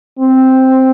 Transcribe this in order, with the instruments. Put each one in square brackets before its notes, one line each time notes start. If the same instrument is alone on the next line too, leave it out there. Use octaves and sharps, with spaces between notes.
[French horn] C4